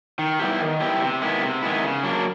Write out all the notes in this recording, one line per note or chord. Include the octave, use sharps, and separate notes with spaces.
D#3
G3 B3 E4 G4
D#3
G3 B3 E4 G4
C3
D#3 G#3 B3 E4
C3
D#3 G#3 B3 E4
C#3
F#3 A#3 D4